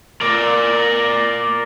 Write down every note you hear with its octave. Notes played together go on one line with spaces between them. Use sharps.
A#4 D5